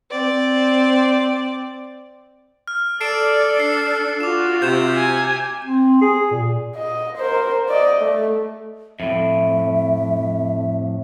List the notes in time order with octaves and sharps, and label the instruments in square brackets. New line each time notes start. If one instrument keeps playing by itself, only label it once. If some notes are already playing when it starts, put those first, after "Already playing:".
[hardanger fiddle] C4 D5
[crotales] F6
[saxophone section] A4 [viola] D5 [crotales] C7 D7 E7
[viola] D4 [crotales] C7
[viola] F4 F#4 [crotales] D6 E7
[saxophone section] C3 [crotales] G6 E7
[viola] G#5
[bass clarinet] C4
G#4
A#2
[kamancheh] D#5
A#4 C5
D5 D#5
A3
[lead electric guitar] F2 A2 [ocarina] E5